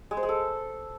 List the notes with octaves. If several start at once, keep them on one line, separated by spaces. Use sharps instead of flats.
G#3
C5
G#3
A4